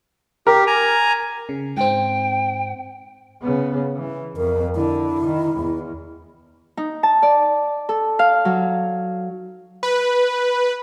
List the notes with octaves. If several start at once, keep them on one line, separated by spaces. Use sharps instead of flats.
G4 A#4
G#5 A#5
C#3
G#2 C4 G5
C#3 B3
E3
F2 A#4
D3 E4
D#3
E2
D#4
A5
D5
A4
F5
F#3
B4